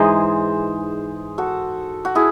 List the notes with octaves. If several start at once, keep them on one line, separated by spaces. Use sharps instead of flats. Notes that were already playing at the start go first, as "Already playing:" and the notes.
Already playing: G#2 E3 G#3 D#4 G#4 C5
F#4 A4
F#4
E4 G#4